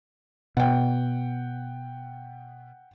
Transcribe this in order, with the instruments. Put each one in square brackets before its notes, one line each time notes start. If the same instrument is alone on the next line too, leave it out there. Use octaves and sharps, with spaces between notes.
[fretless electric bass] B2 [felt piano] F#5 G5